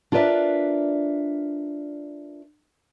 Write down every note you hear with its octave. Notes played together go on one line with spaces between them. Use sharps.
D4 F4 A#4 B4 D5 E5